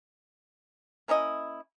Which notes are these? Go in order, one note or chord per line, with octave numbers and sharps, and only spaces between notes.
A#3 C#4 E4 D#5